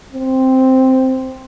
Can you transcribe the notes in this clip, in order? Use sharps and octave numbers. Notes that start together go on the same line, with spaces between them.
C4